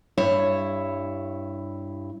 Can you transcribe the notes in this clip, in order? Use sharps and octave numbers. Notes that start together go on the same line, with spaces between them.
G2 E4 C#5